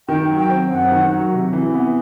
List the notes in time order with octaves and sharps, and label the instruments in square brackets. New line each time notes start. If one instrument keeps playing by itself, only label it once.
[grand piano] D#3 [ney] G5
[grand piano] F#3
[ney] G5
[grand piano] C4
[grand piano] F#2 [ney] F#5
[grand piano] D#3
F#3
C3
E3
B3